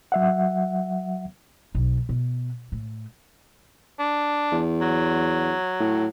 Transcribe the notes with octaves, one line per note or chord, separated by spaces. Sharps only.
F#3 E5 F#5
B1
B2
A2
D4
E2
F#3
A2